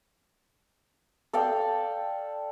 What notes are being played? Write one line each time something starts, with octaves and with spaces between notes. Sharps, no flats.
A4 D5 F5 G5